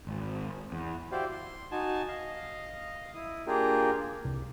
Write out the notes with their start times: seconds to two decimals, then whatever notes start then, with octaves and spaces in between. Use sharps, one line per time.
0.07 G#1
0.72 E2
1.12 E4 F#4 G4 C5 D5 F5
1.31 C6
1.71 D#4 F#4 G#5 A5
2.08 D#5 F5
3.15 E4 D#6
3.47 A#3 D4 F4 G4 G#4 A#4
4.25 C2